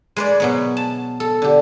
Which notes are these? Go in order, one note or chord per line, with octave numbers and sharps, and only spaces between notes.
G#3 B4 D5
B2 F#3 B3
A5
A4
D3 G4